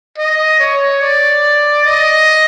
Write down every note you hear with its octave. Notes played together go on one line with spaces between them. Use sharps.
D#5
C#5
D5
D#5